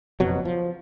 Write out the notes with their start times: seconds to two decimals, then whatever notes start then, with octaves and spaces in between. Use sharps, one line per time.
0.20 F#1 F2 B2 F#3
0.45 F3